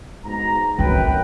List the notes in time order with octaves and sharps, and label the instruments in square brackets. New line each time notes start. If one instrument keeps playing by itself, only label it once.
[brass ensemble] G#2 B2 A#5
[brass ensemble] F#2 B4 [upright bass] D#3 C4 [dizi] G5